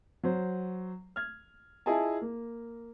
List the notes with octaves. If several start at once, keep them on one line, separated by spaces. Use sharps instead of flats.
F#3 C5
F6 G#6
E4 F4 G#4 D#5 G#5 A5
A#3